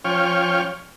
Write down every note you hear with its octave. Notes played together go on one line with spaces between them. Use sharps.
F3 C#4 C#5 G5 F6